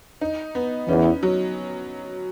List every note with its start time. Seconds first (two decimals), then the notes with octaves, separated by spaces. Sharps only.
0.21 D#4
0.55 B3
0.88 E2 E3 C#4
1.23 F#3